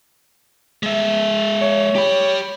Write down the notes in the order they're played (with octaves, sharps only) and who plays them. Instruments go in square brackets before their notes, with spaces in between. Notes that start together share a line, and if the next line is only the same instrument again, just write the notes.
[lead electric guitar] G#3 E5
[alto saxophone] C#5
[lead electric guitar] G4 B5